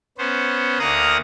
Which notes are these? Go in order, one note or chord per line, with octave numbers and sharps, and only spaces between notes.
B3 C#4 C5
D2 A#3 F5 F#5 A#5 D#6